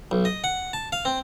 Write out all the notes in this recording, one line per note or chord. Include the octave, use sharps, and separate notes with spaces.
B1
D#5
F#5
A5
F5
C4